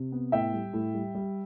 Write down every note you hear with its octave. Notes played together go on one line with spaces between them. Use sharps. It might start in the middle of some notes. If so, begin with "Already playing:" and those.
Already playing: C3
B3
A2 E5 G5
G3
A2
G3
G3